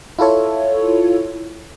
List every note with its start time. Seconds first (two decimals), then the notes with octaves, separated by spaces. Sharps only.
0.19 E4 F4 A4 C#5